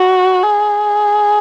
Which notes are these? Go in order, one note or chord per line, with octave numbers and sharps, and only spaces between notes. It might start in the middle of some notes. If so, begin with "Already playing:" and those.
Already playing: F#4
G#4